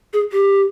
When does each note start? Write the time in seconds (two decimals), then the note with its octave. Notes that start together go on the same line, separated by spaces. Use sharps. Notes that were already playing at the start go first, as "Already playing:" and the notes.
0.13 G#4
0.33 G4